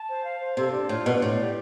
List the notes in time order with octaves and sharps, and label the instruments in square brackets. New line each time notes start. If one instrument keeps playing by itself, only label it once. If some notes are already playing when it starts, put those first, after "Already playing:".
Already playing: [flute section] A5
C5
F5
C5
[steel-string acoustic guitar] C3 [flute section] A4
[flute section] D4
[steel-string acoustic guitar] A2 [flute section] F4
[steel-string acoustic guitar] B2 [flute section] D4
[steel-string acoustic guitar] A2 [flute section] D5
[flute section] G4